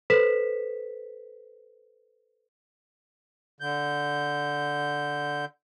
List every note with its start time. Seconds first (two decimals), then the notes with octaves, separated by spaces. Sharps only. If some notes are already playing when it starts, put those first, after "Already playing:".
0.10 A4 B4 C5 B6 E7
3.61 D3 G6